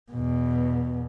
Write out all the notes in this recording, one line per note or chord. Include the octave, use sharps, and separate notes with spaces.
E2 B2